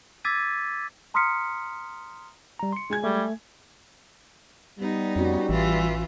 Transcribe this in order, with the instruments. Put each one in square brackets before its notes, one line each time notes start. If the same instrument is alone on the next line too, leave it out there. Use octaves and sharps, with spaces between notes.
[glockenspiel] D6 E6 G#6 A6 B6 D#7
[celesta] A#5 C6 D#6 F6 B6 C#7
[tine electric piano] G3 A#5
C6 C#7
[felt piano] G#3 G#5 G#6
[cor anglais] G3 [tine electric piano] A3
[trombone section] G3 [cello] B3 D#4
[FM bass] F2 [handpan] C#4 F#4
[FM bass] A1 [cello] E3 F4